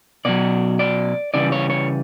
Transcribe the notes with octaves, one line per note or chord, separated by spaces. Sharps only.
B2 F#3 D5
D5
C#3 E3 G3 D5
C#5
C#5